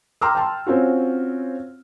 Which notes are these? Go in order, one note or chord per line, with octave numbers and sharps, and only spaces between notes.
G5 A#5 C6 D6 E6 F6
G5 A5 C6
C4 C#4 F4 F#4